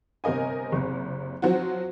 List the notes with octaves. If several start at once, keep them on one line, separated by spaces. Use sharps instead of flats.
G1 C3 A#4 D#5 G#5
F#1 C3
F3 F#3 C4 F#4